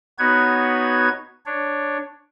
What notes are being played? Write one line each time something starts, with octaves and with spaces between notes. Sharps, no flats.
B3 D#4 F#4 B4 C#5 G#6
D4 C#5